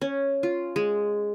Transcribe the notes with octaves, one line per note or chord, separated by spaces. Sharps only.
C#4
F4
G#3